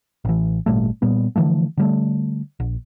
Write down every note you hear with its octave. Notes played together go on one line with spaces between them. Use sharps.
A1 E3
G#1 A#2 G3 A3
A#2 G3 B3
D3 E3 F3 A3
D3 G3 A3
A#1